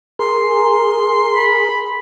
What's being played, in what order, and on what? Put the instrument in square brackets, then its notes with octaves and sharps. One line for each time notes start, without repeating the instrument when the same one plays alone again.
[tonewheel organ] G#4 A#4 [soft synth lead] C6
[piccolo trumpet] B5